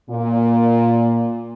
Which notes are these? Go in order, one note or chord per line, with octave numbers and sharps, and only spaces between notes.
A#2